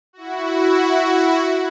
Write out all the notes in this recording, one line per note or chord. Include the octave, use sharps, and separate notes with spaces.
E4 F#4